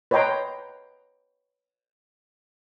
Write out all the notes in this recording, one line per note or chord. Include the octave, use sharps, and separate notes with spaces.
B4 C#5 D#5 G5 A#5 C6